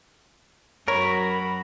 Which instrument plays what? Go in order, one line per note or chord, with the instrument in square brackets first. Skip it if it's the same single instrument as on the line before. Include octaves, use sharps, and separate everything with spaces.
[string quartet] F#2 F#4 [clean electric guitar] A#4 [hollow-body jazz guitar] C#5 [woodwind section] B5